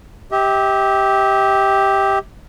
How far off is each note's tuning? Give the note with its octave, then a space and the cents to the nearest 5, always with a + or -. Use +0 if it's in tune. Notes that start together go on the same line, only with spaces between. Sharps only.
G4 +0 E5 -45